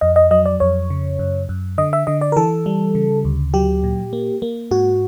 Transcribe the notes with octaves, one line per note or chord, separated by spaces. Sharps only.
F2 D#5
D#5
F#3 D#5
D5
F2 C#5
C#3
F#2
F#2
D3 D#5
E5
D3 D#5
D5
A#4
E3 A4
G3
C#3
D2
F#3 G4
A#2
A#3
A#3
G#2 F#4